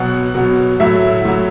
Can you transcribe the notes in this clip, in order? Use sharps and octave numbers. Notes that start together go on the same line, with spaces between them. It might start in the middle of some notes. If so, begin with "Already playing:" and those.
Already playing: B2 F#3 F#5
B2 F#3
A2 F#3 E5
A2 F#3